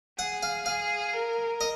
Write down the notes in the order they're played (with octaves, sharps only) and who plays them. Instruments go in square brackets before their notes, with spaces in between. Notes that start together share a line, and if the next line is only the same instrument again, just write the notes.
[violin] G#4 [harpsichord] F#5
[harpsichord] F5
[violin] G#4 [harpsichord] F5
[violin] A#4
[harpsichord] D#5